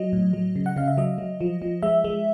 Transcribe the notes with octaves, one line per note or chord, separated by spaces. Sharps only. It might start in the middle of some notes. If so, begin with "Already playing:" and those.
Already playing: F#3 D#5
A2
F#3
C#3
F#5
C#3 F5
E5
F#3 D#5
F#3
F3
F3
G#3 E5
G#3